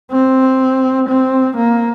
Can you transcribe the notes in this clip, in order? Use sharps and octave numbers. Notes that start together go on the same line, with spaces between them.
C4
C4
A#3